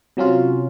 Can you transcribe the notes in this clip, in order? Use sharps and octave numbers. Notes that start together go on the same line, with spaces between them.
C3 F#3 C#4 F4